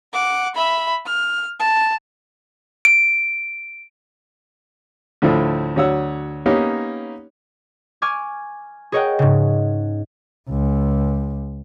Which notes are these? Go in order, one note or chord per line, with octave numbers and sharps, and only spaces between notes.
F#5 D6
E5 B5
F6
A5
D7
D2 A2 F3 A3 E4
D2 F#3 C#5 F#5 E6
A#3 B3 C#4 D#4 G4 C#5
G#5 C#6 D6 F6 G#6
G#4 A#4 C#5 D#5 F#5 G5
G#2 C#3
C#2